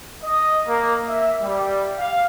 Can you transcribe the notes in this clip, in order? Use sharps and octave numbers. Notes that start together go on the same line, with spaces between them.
D#5
A#3
E5
G3
F5